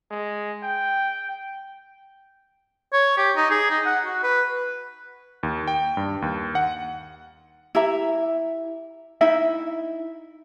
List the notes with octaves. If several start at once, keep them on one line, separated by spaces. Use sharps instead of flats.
G#3
G5
C#5
G4
D#4
G#4
D#4
F#5
F#4
B4
D#2
G5
G2
D#2
F#5
E4 G4 E5 A#5
D#4 E4 E5